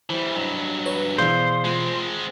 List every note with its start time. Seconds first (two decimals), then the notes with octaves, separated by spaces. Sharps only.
0.10 E3 G3 E4 C5
0.36 G2 F#3 D#5
0.86 B4 C#5
1.18 B2 E3 G#4 C5 D5 F5
1.65 G#3 C4 F4